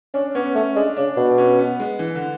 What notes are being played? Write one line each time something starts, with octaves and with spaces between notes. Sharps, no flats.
C#4 D4
B3 C#4
B3
A3 C#4
G#3 D4
C#3 D4
B2 D4
C#4
B3
G#3
E3
D3